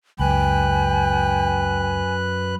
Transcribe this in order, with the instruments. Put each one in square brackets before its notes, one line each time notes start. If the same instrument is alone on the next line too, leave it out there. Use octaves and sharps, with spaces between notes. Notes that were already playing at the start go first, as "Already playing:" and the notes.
[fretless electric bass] C#2 [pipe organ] F#2 B4 F#6 [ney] G5 [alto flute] G#5